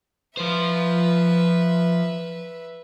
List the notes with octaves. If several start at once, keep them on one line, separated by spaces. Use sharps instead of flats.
F3 B4 C5 E5